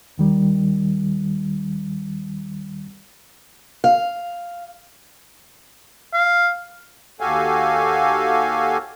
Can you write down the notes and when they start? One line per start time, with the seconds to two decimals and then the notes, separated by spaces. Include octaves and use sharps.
0.18 D#2 D#3 G3
3.84 F5
6.13 F5
7.20 D#2 F#4 G4 A4 F5 G#5